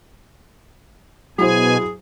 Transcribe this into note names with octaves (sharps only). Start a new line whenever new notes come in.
B2 F#3 E4 G#4 C5 G#5